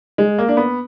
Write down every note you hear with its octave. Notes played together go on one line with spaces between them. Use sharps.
G#3
A#3
D4
B3